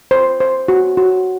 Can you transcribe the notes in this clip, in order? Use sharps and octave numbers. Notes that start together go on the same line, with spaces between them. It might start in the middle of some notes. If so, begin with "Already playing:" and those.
C5
C5
F#4
F#4